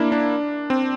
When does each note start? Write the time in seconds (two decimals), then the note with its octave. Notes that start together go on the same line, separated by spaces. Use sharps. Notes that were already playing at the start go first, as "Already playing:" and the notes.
Already playing: A#3 D4 E4
0.12 D4
0.70 C4